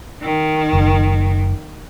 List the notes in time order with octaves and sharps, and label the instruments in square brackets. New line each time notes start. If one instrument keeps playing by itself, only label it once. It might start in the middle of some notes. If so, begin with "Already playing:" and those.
[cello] D#3
[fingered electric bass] F#1